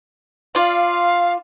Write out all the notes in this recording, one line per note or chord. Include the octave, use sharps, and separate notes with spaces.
F4 D5 F5